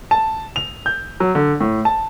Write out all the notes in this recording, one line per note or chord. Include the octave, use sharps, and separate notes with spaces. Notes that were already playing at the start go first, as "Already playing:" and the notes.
A5
F7
G6
F#3
D3
A2
A5